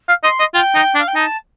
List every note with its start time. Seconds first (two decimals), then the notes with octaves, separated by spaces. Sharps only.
0.09 F5
0.23 D#5 C6
0.40 D#5
0.54 F4 G5
0.75 D#4
0.95 D4
0.98 F5
1.07 G5
1.15 D#4 A5